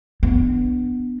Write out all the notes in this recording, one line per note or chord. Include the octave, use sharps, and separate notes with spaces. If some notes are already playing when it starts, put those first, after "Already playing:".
B3 D4